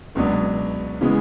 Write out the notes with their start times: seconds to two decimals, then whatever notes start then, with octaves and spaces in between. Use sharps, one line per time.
0.15 C#2 B2 F#3 B3 D4
1.01 C#3 E3 G#3 B3